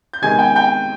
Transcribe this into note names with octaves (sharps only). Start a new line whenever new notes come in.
G6
C3 D#3 G#3 B3 G#5 G#6
G5 G6
G5 G6